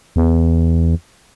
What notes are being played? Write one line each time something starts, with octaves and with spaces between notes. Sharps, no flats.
E2